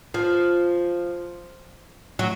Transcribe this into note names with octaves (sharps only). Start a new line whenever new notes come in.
F3
F#3